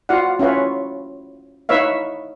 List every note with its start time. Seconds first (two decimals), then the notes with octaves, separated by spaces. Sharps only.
0.09 F4 F#4 D5 F5 F#5
0.39 C#4 E4 F4 B4 C#5
1.69 D#4 E4 B4 C#5 E5 F5